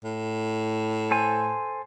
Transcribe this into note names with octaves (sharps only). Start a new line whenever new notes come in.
A2
A4 C5 G#5